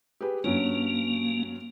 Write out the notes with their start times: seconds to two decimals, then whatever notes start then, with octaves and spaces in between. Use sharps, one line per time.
0.21 G4 G#4 B4
0.44 G2 F#3 A#3 C#4